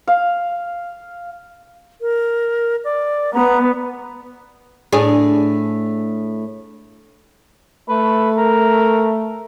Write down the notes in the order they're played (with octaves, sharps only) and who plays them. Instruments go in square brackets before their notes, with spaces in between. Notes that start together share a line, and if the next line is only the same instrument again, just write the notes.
[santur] F5
[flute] A#4
D5
[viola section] B3 [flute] A#5
[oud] A2 D4 G#4
[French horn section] A3 [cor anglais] B4
[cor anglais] A#4